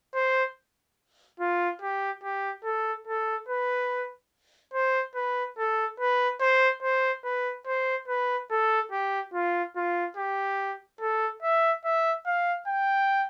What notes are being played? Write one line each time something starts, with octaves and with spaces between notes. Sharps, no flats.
C5
F4
G4
G4
A4
A4
B4
C5
B4
A4
B4
C5
C5
B4
C5
B4
A4
G4
F4
F4
G4
A4
E5
E5
F5
G5